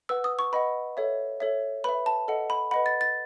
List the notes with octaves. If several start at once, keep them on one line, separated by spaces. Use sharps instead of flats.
B4 F#5 E6
D#6
C#6
B4 D#5 F#5 B5
A4 C#5 E5
A4 C#5 E5
B4 E5 B5
A5
A4 D#5 F#5
B5
B4 D#5 F#5 B5
A6
A6